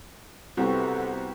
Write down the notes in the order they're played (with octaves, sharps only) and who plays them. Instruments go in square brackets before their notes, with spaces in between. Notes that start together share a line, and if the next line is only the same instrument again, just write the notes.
[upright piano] C2 [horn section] C3 [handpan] B3 C4 F#4 [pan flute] A4